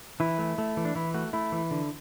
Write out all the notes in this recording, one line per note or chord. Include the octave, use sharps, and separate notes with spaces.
E3 E4
A3
A3
E3
D4
E3 E4
A3 F#4
A3 E4
E3
D3